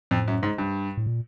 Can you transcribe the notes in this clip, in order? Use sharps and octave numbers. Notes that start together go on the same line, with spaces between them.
F2 A2
F#2
G#2
G2
A2
A#2